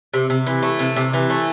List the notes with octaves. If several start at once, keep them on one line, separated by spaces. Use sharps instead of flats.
C3
C3
E3
A3
C3
C3
E3
A3